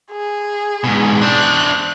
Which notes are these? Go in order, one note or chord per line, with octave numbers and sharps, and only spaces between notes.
G#4
G#2 B2
D4 C5 F#6